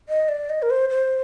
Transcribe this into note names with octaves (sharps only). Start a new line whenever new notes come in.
D#5
D5
D#5
A#4
C5
C5